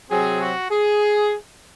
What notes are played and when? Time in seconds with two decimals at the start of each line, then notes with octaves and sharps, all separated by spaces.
0.11 C3 F#3 C4 G#4
0.40 F#4
0.70 G#4